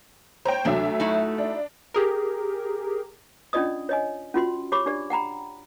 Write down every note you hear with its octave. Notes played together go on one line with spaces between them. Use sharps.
C5 C#5 G5 A#5
D2 C3 F#3 A3 D4 E5
D#4 E4 F#4
D4
G4 G#4 A#4
C#4 D4 F4 D5 D#5 D#6
C#5 D#5 G#5
C#4 F4 F#4 C6
G4 C#5 B5 D6
D4 G4 D5
F#5 G5 A#5 B5